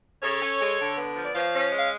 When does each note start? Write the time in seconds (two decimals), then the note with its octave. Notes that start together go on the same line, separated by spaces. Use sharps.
0.22 C#3 A4 C#5
0.41 C#4
0.60 G#3
0.78 D3
0.96 B3
1.16 F3
1.25 D5
1.34 F3 C#5 F5
1.53 C#4
1.71 G#3
1.78 F5